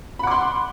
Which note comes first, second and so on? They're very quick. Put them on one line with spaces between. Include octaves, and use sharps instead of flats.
B5 F#5 D6 C6